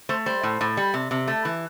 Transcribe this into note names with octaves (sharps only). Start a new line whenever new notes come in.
A3 C5
G3 C5
A2
A2
G3
C3
C3
A3
E3